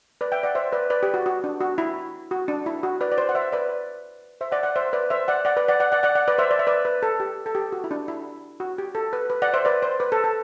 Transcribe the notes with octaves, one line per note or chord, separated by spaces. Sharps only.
B4 D5
E5 G5
D5 F#5
C5 E5
B4 D5
B4 D5
G4
F#4
F#4
D4
F#4
E4
F#4
D4
E4
F#4
B4 D5
D5
C5
F#5
C5 E5
B4 D5
C5 E5
D5 F#5
D5 F#5
C5 E5
B4 D5
C5 E5
D5 F#5
D5 F#5
B4 D5
D5 F#5
D5 F#5
D5 F#5
D5 F#5
D5 F#5
B4 D5
C5 E5
D5
E5
B4 D5
B4
A4
G4
A4
G4
F#4
E4
D4
E4
F#4
G4
A4
B4
B4
D5 F#5
C5 E5
B4 D5
C5
B4
A4
A4